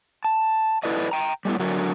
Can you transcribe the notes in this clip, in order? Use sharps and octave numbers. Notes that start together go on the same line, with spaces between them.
A5
E4 A4 B4 D5 D#5
G5 A#5
G3 A3 B3 E4
D3 F#3 D4 F#4 A#4